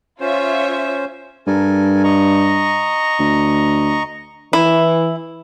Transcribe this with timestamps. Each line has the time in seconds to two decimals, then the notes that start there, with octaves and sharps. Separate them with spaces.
0.21 C#4 F4 C5 C#5 E5
1.47 G2 A4 A#4 G#5
2.03 D#5 A#5 C#6
3.19 D2
4.53 E3 E4